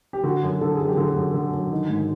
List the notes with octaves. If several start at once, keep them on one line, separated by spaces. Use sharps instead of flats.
G4
D3 F#4
F#2
D3 A4
F#2 G#4
G4
D3
G#4
F#2
D3
F#2
D#3
G#2